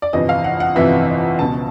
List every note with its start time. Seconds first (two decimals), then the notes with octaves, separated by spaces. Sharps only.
0.02 D5
0.13 G1 F2 C3 E3 D#5
0.29 F5
0.44 F#5
0.60 F#5
0.76 G1 F2 C3 E3 E5
1.39 C#2 B2 A5